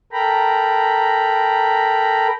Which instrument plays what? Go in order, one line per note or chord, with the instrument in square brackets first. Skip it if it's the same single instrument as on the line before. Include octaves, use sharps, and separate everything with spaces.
[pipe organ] A4 A#4 G5 A#5 B5